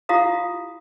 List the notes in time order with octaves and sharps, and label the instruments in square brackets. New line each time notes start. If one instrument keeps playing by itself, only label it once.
[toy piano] E4 F4 G4 F5 A#5 D#6